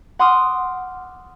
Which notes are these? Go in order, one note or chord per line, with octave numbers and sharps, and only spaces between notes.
F#5 C6 D6 D#6 F6